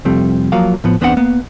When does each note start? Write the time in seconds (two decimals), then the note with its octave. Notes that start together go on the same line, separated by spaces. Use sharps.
0.05 C2 F2 G3 A3 C4
0.52 F3 F#3 A#3 F4 F5
0.84 A2 F3 B3
1.01 E2 B3 C4 D4 G#4 F#5
1.17 A#3 B3